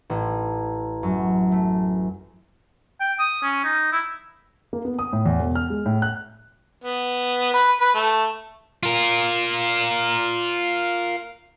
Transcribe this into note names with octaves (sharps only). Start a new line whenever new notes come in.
A1
F#2
A3
G5
D#6
C#4
D#4
E4
A#3
B3
D#6
A2
E2
E1
F6
G#3
A2
F#6
B3
B4
B4
A3
F4 A#4